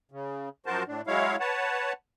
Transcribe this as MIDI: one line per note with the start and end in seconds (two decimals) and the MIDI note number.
0.11 0.49 49
0.66 0.83 42
0.66 0.83 53
0.66 0.83 66
0.66 0.83 70
0.66 0.83 72
0.66 0.83 81
0.87 1.01 45
0.87 1.01 62
1.07 1.36 54
1.07 1.36 56
1.07 1.36 64
1.07 1.36 73
1.07 1.36 77
1.40 1.93 71
1.40 1.93 73
1.40 1.93 78
1.40 1.93 81